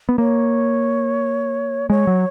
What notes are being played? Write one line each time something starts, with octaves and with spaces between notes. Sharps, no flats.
B3
A#3 C#5
G#3 C#5
F#3